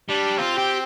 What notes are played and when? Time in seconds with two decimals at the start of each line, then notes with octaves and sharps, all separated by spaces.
0.09 G3 D4
0.38 C4 F4
0.58 G4